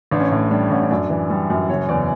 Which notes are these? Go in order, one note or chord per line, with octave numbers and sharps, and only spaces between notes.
A1 D4
C#4
A2 D4
G3 D4
A1 C#4
C#4
F#2 D4
E3
G3
F#2
F#1 C#5
E2 D5